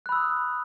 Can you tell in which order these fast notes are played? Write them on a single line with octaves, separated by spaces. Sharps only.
F#6 B5 E6 D#6